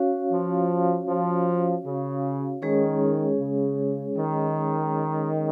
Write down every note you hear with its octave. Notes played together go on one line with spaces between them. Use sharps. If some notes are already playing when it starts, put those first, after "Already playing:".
Already playing: C#4 F#4 C#5 F5
F3
F3
C#3
D#3 G#3 C#4 G#4 C#5
C#3
D#3